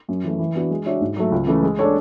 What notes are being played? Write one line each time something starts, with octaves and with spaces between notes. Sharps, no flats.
F#2
E3 A3
E3
B3 D4 F#4
G#3
D4 F#4 C#5 E5
G#2
F#3 A3
C#2
C#3 E3 A3
G#3
D4 A4 C#5